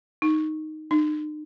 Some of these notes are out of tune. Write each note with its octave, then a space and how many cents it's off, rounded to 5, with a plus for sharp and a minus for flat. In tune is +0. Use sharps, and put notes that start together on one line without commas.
D#4 -5
D#4 -40